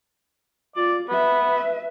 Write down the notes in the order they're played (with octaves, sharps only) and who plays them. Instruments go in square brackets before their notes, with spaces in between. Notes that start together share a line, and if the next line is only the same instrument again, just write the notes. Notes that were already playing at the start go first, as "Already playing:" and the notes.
[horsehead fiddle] F4 [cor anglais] D5
[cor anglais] B3 [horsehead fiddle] B4 E5